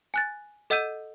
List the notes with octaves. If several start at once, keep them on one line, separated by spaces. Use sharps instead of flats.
G#5 F#6 A6
A4 D#5 F#5 E6 G6 D#7